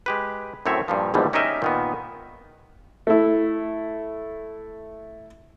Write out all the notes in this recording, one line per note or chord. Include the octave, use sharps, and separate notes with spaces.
G#3 G4 B4
F#2 A2 C4 C#5 E5
G2 A#2 F3
A#1 E2 G#2 B2 D3 G3
C#4 D#4 G4 A#4 D#5 E5
A#2 D#3 B3
A3 E4